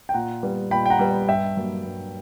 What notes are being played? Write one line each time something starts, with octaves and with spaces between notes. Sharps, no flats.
G5
A#2 F#5 A#5
G3 B3
A#2 G5 B5
G5
F#5 A#5
G3 B3
G2 E5 G5
F#3 A#3
G2